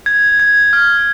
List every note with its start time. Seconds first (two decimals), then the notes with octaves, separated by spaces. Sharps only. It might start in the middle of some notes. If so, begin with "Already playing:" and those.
0.06 G#6
0.40 G#6
0.73 F6